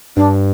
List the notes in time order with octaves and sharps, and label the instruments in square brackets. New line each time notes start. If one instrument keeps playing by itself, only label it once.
[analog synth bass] G2 [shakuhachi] D4